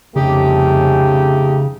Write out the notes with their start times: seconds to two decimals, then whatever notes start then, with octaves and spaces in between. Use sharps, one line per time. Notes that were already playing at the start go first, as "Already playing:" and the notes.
0.16 C2 F2 C#3 A3 C#4 D#4 G4